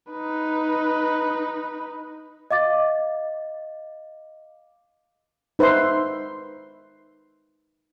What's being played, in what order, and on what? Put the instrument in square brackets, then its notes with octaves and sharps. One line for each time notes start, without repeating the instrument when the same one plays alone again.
[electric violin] D#4 B4
[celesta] D#5 F5 D6 A6
[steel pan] D#4 B4 C5 E5 C6